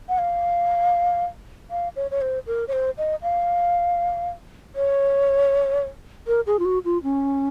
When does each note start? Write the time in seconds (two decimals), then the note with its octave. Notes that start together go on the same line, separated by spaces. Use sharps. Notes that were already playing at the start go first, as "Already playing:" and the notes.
0.09 F#5
0.18 F5
1.71 F5
1.96 C#5
2.11 C#5
2.21 C5
2.47 A#4
2.68 C#5
2.73 C5
2.98 D#5
3.22 F5
4.76 C#5
6.27 A#4
6.47 G#4
6.59 F4
6.65 F#4
6.85 F4
7.03 C#4